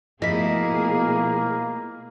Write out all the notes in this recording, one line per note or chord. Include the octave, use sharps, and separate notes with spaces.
B2 F3 A3 A#3 E4 G#4 D#5 B6